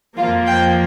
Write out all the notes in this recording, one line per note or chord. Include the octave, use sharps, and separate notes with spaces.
F2 F3 A#3 F4
G5